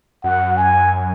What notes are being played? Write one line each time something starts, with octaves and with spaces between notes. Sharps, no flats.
F#2 F#5
G#5